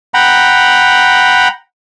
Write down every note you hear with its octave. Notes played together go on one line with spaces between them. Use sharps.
F#5 G5 A#5 B5